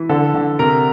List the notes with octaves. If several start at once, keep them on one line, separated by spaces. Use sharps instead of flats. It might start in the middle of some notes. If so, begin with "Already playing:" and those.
Already playing: E3
D3 A4
D3
C3 A#4